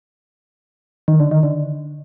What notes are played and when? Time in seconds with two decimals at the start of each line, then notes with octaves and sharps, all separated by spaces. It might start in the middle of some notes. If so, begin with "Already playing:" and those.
1.08 D#3
1.20 D3
1.31 D#3
1.43 D3